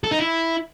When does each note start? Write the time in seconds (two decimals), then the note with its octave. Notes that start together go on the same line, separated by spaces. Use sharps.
0.04 A4
0.12 D#4
0.19 E4